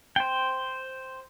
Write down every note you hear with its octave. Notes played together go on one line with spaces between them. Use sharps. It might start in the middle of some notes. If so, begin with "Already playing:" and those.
C5 G5